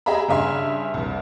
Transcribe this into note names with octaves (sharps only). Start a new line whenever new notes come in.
G4 G#4 D#5 E5 A#5 B5
G2 C#3 E5 G#5 C6
F1 C2